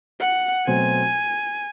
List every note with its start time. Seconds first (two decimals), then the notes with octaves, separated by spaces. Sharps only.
0.20 F#5
0.67 B2 F#3 A3 C4 G#5